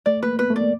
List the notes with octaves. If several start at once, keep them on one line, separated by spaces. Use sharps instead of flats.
A3 D5
A#3 B4
B3 B4
A3
D5
A#3